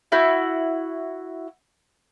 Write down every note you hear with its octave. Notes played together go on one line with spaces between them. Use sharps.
E4 F#4 F#5 G6